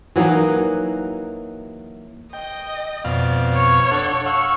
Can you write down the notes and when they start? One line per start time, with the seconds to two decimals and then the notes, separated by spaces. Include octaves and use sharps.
0.16 E3 F#3 A#3 D#4
2.33 D#5 G5
3.04 F2 B2 D5 F5
3.55 C#5
3.91 D4 A4 F#5
4.26 F5 F#5 C#6 E6